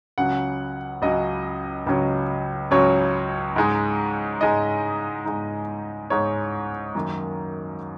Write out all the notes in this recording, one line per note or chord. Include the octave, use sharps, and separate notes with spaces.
C#2 C#3 F#3 C#4 F#5
C#2 C#3 F#3 C#4 D#5
C#2 C#3 F#3 C#4
C#2 C#3 F#3 C#4 C#5
G#2 G#3 D#4
G#2 G#3 D#4 D#5
G#2 G#3 D#4
G#2 G#3 D#4 C#5
F#2 D#3 F#3 A#3